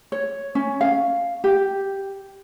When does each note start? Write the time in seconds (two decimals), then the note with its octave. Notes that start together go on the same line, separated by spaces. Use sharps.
0.12 C#5
0.55 C#4
0.81 F5
1.44 G4